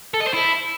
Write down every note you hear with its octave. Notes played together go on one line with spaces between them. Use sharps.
A4
D#5
C5
E4